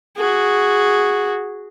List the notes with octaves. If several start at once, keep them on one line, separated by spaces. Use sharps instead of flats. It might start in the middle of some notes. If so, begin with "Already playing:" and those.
F#4 G#4